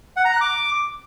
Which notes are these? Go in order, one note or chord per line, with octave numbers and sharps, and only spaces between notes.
F#5
A#5
F#6
D6